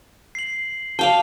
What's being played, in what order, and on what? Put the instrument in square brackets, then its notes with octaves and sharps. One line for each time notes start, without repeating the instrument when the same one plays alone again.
[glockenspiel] C7 F#7
[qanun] D5 F5 G5 [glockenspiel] A5 F7